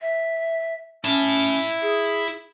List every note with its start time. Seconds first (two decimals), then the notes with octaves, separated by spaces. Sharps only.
0.01 E5
1.04 C#4 E4 A5
1.82 G#4